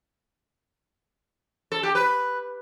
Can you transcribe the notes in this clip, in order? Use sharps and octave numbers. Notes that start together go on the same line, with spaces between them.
A4
G4
B4